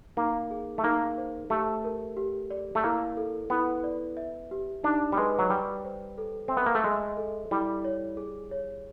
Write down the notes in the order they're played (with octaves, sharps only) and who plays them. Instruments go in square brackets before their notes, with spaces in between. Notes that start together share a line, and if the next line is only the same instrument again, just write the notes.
[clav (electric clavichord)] A#3 [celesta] D#4
[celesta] G#4
[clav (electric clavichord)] A3
[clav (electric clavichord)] A#3 [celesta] D#4
[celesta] C5
[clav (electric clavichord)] A3 [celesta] G4
[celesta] A#4
G4
D5
[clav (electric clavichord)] A3
[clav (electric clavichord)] A#3 [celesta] E4
[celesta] A4
[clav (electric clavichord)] B3 [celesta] E4
[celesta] D5
E5
G4
[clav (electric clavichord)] D4 [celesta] D#4
[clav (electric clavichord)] G3
[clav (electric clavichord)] G#3 [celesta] B4
[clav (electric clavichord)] F#3
[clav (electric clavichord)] G3 [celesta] G5
[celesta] C5
A4
[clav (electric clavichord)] C4 [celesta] E5
[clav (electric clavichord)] B3
A#3
A3
[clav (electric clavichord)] G#3 [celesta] E5
[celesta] A4
[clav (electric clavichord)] G3 [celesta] E4
[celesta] C#5
G#4
C#5